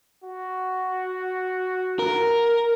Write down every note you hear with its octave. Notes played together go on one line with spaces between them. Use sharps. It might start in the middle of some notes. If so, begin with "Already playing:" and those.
F#4
A#4